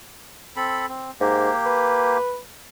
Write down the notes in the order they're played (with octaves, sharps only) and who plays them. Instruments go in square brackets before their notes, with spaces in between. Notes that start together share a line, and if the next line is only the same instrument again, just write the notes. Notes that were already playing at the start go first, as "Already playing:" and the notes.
[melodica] C4 A4 B5
C4
[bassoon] G#2 [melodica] A#3 G4
[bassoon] B4